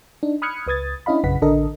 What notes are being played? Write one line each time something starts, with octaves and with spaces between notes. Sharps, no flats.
D4 D#4
B5 D#6 F6 F#6 G#6 C#7
C#2 B4 D#6 G#6 A6
C#4 D4 E4 D#5 F5 B5
A#1 F#2 C#3 B4 F#5 B6
A1 D3 D4 A4 A#4 D#5